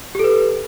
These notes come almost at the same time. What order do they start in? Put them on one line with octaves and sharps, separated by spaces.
G4 A4 B4